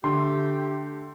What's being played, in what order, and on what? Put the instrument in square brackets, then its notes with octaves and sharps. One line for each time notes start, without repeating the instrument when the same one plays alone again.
[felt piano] D3 [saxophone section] A3 G4 [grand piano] C6